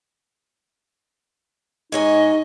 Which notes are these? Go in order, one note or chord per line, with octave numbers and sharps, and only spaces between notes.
G#2 D#4 C#5 D#5 G#5